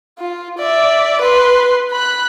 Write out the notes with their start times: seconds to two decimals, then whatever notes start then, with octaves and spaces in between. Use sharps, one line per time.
0.19 F4
0.58 D5 E5
1.21 B4 C6
1.91 B5 F#6